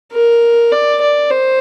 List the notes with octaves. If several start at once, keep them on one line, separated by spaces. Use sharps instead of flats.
A#4
D5
D5
C5